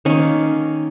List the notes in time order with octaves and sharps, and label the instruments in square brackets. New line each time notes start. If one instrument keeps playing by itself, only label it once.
[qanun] D#3 A#3 C#4